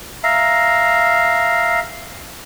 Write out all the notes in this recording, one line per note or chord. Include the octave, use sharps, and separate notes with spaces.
E5 F5 A#5